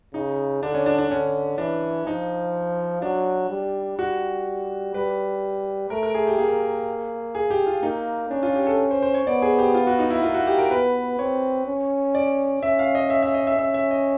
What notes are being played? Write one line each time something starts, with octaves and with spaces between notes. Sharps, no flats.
C#3 D#4
D3 D4
C#4
D4
D4
D3 C#4
E3 D4
F3 D#4
F#3 D4
G3
G3 F#4
G3 B4
A3 A#4
A#4
G#4
G4
A#3 G#4
G#4
G4
F4
A#3 D#4
C#4 D4
F4
G4
A4
C5
C5
C#5
B3 D5
G#4
G4
F4
F#4
D#4
E4
A#3 F4
F#4
G4
A#4
B3 B4
C4 C#5
C#4
D5
C#4 E5
F5
D#5
E5
E5
D#5
E5
C#4 E5
E5
D#5